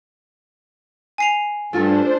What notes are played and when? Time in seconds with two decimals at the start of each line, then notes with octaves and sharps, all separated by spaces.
1.18 G#5 C7 F7
1.73 G2 A3 D4 F4 A4 C5